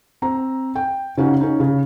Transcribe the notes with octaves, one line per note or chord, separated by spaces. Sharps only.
C4 A#5
G5
C#3 C#4 D#4 F#4
C#4 D#4
C#3